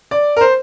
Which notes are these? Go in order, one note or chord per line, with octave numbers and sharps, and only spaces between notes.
D5
A#4
C5